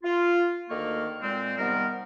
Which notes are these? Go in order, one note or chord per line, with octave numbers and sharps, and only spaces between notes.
F4
D2 D#3 A#3 A4 C#6 F6
A#2 G#3 C4
C3 D#3 G3 B3 A#4